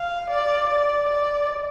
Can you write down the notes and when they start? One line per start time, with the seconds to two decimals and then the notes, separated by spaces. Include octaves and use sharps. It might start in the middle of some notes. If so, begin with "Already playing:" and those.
Already playing: F5
0.30 D5
0.69 D5
1.08 D5